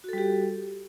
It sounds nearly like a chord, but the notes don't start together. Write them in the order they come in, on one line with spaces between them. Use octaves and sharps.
F#4 A4 G3 G4